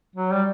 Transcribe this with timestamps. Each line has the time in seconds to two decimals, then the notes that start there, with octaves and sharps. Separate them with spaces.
0.16 F#3
0.31 G3